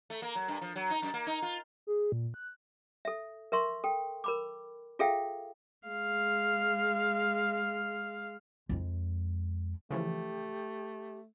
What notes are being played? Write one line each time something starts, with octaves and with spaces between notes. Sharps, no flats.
A3
A#3
F#3
G2
F3
F#3
D#4
F#2
A#3
D#4
F4
G#4
A#2
F#6
A4 E5
A#4 E5 C6 C#6
A4 G5
A#4 B5 D6
F4 G#4 A4 E5 F5 G5
G#3 F5
F2 G#3
C#3 E3 F3 A3 G4